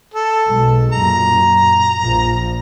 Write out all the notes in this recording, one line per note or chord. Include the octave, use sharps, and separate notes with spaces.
A4
B1 G#3
F#2 A#2 A#5
A#1 F3